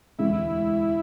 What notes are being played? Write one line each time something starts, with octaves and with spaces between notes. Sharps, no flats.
E1 D2 C3 E3 G#3 E4